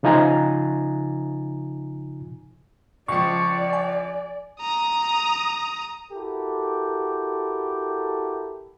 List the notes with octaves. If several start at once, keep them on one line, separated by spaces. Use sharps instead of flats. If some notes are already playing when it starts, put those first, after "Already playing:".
C#3 F3 D#4 F4 G#5 A#5
C#2 F3 D5 C#6 C#7
G#5
A#5 D#6
E4 F#4 G4 A4 A#4